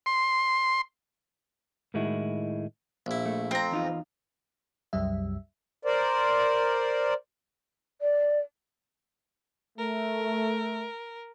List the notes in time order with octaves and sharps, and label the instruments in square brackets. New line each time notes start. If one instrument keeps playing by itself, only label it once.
[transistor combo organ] C6
[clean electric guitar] A2 D#3 G#3 E4 F#4
[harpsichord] A#1 E4
[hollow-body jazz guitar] A3
[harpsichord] F2 [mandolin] C4 A#5
[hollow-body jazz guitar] E2 D#4 F4
[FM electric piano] C2 F#2 G3 E5
[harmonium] A#4 C5 D5
[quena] D5
[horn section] A3 [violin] A#4